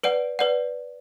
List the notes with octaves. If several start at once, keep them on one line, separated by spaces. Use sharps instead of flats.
B4 D5 F#5 D7
B4 D5 F#5